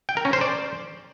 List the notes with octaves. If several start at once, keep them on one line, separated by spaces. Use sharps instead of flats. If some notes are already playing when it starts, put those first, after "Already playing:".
G5
A#4
C#4
C5
D5